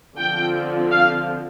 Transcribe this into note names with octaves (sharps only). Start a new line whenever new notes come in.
D3 F3 C4 G5
F5